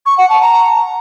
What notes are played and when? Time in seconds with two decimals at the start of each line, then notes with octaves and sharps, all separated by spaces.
0.06 C#6
0.18 F#5
0.29 A5
0.41 A#5